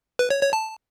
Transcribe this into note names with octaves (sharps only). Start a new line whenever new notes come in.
B4
C#5
C#5
A5